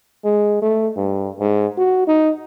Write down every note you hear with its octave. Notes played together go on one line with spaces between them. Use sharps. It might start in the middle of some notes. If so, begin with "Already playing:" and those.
G#3
A3
G2
G#2
F#4
D#4